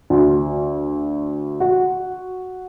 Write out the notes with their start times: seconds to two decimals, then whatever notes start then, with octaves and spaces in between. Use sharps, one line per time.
0.10 D2
1.60 F#4